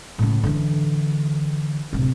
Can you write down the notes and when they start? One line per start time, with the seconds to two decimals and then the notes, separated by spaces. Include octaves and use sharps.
0.18 A2 C#3
0.43 D3 E3
1.93 D1 C3